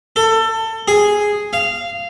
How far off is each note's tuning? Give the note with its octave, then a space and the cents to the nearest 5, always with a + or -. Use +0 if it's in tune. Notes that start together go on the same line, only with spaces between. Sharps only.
A4 +25
G#4 +0
F5 -15